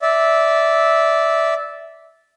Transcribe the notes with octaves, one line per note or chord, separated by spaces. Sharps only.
D5 E5